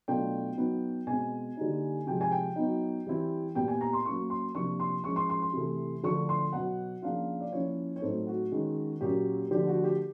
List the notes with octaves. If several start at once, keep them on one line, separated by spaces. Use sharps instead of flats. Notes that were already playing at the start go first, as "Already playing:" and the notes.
B2 F#3 A3 D4 F4 G5
F#3 B3 D#4
B2 G#3 C4 G#5
D3 G3 A#3 D#4
C3 F3 G#3 G5
G#5
G5
F#3 B3 D#4
E3 G3 C4 E4
A#2 G3 B3 G5
G#5
A#5
C6
F#3 A#3 C#4 C#6
C6
C3 F3 A#3 D4 F4 C#6
C6
F3 G#3 C#4 C#6
C6
C6
C6
C3 E3 A3
D3 F3 A3 D4 C#6
C6
B2 F#3 B3 F#5
C#3 F3 A#3 D4 F4 F5
D5
F3 A#3 C#4 E4 C#5
C#5
A2 F#3 A3 C4 D#4 C5
F#4
D#3 G#3 C#4
A#2 F#3 A#3 C#4 G4
D3 F3 A3 D4 G4
F#4
G4